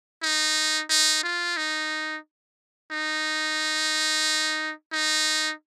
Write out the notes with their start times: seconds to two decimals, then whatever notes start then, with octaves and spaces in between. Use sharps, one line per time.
0.23 D#4
0.90 D#4
1.23 F4
1.57 D#4
2.91 D#4
4.92 D#4